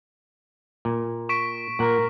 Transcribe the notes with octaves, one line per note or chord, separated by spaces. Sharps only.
A#2
C#6 B6 D7
A#2 A#4 F#5